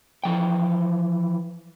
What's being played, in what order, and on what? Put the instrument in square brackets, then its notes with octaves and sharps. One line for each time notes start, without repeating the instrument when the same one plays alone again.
[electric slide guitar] E3 F3 G5